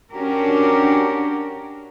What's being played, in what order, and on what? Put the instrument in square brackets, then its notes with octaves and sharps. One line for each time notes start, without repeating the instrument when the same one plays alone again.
[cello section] C#4 D4 F#4 G4 A#4